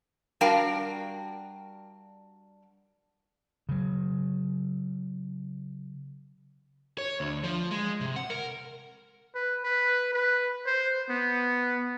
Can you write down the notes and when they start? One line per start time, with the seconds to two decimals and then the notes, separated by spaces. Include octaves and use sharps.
0.41 G3 D4 F#4 A#4 F5 G5
3.69 C#3 F#3
6.98 C#5
7.20 D2
7.44 F3
7.71 G#3
8.01 C3
8.16 F#5
8.30 A#4
9.35 B4
9.64 B4
10.13 B4
10.66 C5
11.10 B3